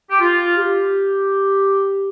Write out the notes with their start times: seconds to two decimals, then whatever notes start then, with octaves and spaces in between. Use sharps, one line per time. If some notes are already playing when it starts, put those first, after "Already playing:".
0.10 G4
0.21 F4
0.57 G4